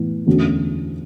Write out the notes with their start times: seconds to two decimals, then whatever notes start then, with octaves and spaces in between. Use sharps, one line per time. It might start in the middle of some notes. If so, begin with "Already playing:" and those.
Already playing: A2 E3 B3 E4
0.27 E2 D3 A3 C#4 F#4